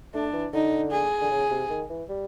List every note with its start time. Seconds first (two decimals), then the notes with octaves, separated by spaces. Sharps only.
0.14 A3 D4
0.33 E3
0.53 D3 D#4
0.92 G#4
1.21 D3
1.31 C#3
1.51 C3
1.70 D#3
1.90 E3
2.09 G3